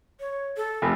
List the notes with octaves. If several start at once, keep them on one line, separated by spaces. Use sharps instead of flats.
C#5
A4
F1